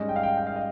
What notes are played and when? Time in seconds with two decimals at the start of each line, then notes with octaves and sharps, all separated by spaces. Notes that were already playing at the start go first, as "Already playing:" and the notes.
Already playing: G#2 G3 C#4 D#5
0.09 G5
0.16 F5
0.23 G5
0.38 G5
0.47 F5
0.56 D#5